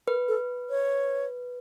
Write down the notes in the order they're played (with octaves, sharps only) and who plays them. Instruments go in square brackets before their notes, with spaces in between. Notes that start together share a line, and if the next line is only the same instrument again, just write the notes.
[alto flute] A#4 [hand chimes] B4
[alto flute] A4
C#5